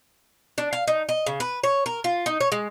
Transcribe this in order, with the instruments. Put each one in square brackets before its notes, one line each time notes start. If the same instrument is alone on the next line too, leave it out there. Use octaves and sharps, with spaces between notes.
[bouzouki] D4
F5
D#4
D#5
C#3
B4
C#5
A#4
F4
D#4
C#5
G#3